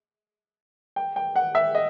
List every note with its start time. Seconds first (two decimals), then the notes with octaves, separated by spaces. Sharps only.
0.96 G5
1.16 G5
1.36 F#5
1.55 E5
1.75 D#5